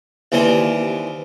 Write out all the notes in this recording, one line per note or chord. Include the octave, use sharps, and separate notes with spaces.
D#2 E3 G3 C4 A5